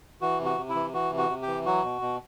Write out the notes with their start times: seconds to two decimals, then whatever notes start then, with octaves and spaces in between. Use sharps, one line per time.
0.21 E3 F#4
0.39 C3
0.45 F#4
0.58 C3
0.69 E4
0.75 E3
0.93 E3 F#4
1.11 C3
1.17 F#4
1.29 C3
1.42 G4
1.47 E3
1.66 F#3 F#4
1.83 B2
2.01 B2